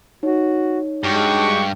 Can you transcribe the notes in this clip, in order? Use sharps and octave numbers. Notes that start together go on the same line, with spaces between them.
D#4 F#4 C#5
G2 G#3 F#4 G4 C#6